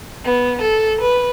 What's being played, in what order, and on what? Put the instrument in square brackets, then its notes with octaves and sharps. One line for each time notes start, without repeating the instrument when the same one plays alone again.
[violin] B3
A4
B4